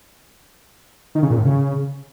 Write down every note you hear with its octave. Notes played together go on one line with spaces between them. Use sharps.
D#3
C#3
A#2
A2
C#3